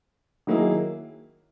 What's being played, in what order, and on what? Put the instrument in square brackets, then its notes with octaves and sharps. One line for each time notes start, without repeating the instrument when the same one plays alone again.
[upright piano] D#3 F#3 A#3 E4 G#4